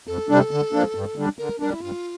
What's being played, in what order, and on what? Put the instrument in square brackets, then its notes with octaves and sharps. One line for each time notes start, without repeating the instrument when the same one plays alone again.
[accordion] F2 [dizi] A4
[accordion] C3 G3 D4
D3
F3 A#3 D4
G2
D3 G3 D4
[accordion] D3 [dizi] A#4
[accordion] G3 D4 [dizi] A#4
[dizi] E4
[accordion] G2 [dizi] F4